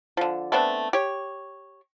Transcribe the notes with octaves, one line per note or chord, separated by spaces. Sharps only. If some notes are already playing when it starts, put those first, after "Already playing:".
D3 F3
A3 B3 C4 D4
G4 C#5